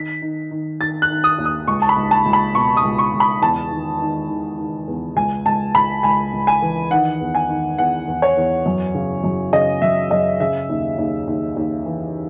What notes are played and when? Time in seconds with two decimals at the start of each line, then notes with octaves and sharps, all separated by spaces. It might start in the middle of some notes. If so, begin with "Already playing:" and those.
Already playing: D#3 B6
0.22 D#3
0.51 D#3
0.80 D#3 A6
1.02 F#6
1.10 D#3
1.24 D#6
1.38 D#2
1.45 D#6
1.68 C#2 C#6
1.82 A5
1.89 B5
1.97 C#2
2.11 A5
2.26 C#2
2.33 B5
2.55 B2 C#6
2.77 D#6
2.84 C#2
2.99 C#6
3.14 C#2
3.20 B5
3.42 E2 A5
3.71 D#3
4.01 D#3
4.29 D#3
4.58 D#3
4.88 E2
5.16 C#2 G#5
5.46 C#2 A5
5.75 C#2 B5
6.03 C#2 G#5
6.33 C#2
6.47 G#5
6.62 E3
6.91 D#3 F#5
7.21 E2
7.35 G#5
7.49 D#3
7.78 E2 F#5
8.08 E2
8.22 C#5
8.37 E2
8.66 F#2
8.95 C#3
9.24 F#2
9.52 C#3 D#5
9.82 F#2 E5
10.11 F#2 D#5
10.40 C#3 E5
10.69 D#2
10.98 D#2
11.27 D#2
11.57 D#2
11.86 E3